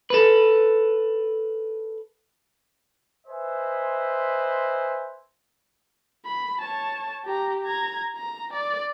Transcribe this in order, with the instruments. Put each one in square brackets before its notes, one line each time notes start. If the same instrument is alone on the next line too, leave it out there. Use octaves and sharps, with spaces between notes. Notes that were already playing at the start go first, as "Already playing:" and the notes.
[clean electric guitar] A4 B4
[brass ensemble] B4 C5 D#5 E5 G#5
[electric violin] B5
C#5 A5
G4 A#5
A#5 G#6
A#5
D5